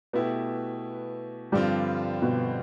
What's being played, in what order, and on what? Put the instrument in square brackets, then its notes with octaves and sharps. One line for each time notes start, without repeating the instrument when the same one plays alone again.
[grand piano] B2 A3 E4 G4 [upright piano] B3
[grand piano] G2 D3 F3 C4 F4 [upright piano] G3
[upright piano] B2